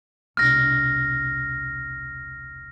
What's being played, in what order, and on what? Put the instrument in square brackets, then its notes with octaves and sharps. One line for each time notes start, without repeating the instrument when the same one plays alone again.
[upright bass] E1 C2 [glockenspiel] F6 A#6